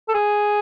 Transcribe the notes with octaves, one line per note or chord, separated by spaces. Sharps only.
A4
G#4